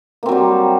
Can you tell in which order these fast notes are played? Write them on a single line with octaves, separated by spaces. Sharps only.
A#3 C4 F#3 G3